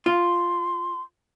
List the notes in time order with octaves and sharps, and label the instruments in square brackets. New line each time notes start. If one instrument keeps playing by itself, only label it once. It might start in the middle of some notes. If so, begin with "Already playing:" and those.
[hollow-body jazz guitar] F4 [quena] C6